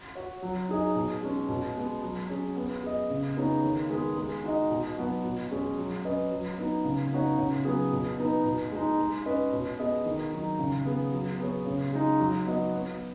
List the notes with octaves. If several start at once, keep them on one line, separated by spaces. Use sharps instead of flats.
F#4 C#5
F#3
D#4 G#4 D#5
B2
G#3 C#4
B2
G#3 B3
F#3
C#4 G#4
B3
G#4 D#5
C#3
B3 D#4 G#4 C#5
D#3
G#3 B3 G#4
G#3
D#4 F#4 D#5
B2
F#3 B3 F#4
B2
G#3 C#4 G#4 C#5
F#3
C#4 B4 D#5
F#3
B3 D#4
C#3
B3 D#4 F#4 C#5
C#3
F#3 B3 G#4
B2
B3 D#4 B4
B2
G#3 D#4
G#3
C#4 B4 D#5
B2
B3 G#4 D#5
D#3
F#3 D#4
C#3
B3 G#4
F#3
B3 G#4 C#5
C#3
G#3 D#4
F#3
B3 F#4 D#5
B3